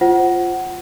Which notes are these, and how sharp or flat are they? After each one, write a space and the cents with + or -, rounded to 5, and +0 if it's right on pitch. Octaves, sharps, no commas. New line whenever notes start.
F4 +0 C5 +10 F#5 +10